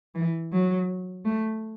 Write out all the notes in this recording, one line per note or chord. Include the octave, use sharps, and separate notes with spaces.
E3
F#3
A3